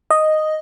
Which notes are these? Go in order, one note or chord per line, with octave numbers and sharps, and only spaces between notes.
D#5